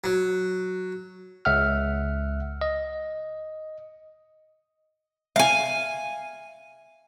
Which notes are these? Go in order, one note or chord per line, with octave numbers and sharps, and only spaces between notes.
F#3
C#2 E5 F#5 F6
D#5
E5 F5 G#5